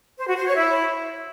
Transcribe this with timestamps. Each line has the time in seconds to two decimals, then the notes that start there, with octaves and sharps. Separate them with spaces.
0.18 C5
0.27 F#4
0.37 C5
0.46 C#5
0.56 E4